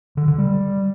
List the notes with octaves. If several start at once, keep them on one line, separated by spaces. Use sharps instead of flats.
D3
D3
G3